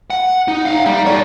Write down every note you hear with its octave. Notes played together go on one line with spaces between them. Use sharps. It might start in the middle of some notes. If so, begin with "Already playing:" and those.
F#5
D#4
F5 F#5
G3 D#4
A4 C#5 D5